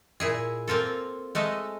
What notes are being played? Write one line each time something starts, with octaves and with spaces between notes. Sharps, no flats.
A#2 E4 G#4
A#3 C4 F4 A4
G#3 A3 A4 D#5